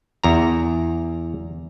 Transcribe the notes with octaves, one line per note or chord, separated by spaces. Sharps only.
E2 A#5